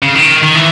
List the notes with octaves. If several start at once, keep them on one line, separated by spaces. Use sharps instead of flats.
C#3
D#3
D#3
E3